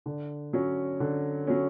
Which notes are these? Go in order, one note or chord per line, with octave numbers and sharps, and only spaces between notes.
D3
F#3 C#4
D3
F#3 C#4